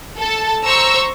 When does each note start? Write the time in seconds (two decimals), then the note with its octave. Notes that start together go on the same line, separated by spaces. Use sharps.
0.19 A4 A5
0.64 C5 A#5 C#6 E6